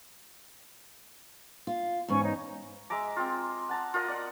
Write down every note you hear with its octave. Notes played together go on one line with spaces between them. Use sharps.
F4
E2 G#2 C#4 G#5 C#6
D#4 C#5
G#3 E5 A#5 D6
C4 F4
F#5 A5 A#5
F4 A#4 D#5 F#5
D5 F#5